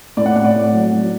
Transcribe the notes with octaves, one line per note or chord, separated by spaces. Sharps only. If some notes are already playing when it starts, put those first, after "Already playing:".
A2 D5
F#5
A2 F#5
D5
A2
F#3
F#3